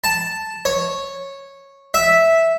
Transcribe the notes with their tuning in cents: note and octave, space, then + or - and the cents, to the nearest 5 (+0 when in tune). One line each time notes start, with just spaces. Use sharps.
A5 +0
C#5 -10
E5 -5